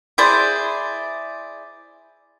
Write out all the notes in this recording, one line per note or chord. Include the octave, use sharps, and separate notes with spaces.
E4 G#4 C5 D5